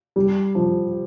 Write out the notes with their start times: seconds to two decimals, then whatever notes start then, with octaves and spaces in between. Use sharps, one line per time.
0.16 G3
0.55 F3